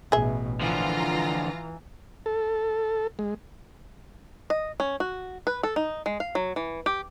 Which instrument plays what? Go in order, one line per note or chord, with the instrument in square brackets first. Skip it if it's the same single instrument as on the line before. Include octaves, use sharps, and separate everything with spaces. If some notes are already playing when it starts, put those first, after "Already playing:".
[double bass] A1 B2 [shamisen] G#4 E5
[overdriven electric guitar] D3 F3 [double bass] E3 [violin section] F4 A#5
[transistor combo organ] A4
G#3
[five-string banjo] D#5
C#4
F#4
B4
A4
D#4
G#3
F5
F#3
E3
G4